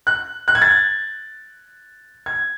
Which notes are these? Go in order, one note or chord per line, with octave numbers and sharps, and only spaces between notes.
F#6
F#6
G#6
A6
G#6